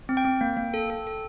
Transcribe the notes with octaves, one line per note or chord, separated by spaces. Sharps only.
C4
G5
C4
A#3
A#3
A4
A4
A4